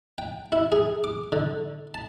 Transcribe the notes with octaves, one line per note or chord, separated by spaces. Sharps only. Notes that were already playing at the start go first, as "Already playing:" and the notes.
G5
E4
G#4
D6
D3
A5